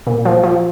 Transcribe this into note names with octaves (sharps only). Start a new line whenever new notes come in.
A#2
F3
F3